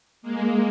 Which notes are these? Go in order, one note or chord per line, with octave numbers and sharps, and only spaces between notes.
G#3 A#3